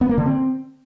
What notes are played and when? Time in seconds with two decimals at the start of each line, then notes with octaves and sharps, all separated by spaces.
0.01 B3
0.09 A#3
0.18 D3
0.26 C4